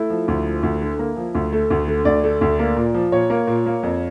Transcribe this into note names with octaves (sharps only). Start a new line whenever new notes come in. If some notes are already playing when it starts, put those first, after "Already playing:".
Already playing: A3 E4
F3
D2
F3
D2
D3
A#3
F3
D2
A3
D2
D3
D2 D5
A3
D2
A#3
A#2
F3
A#2 C#5
A#3
A#2
A#3
F2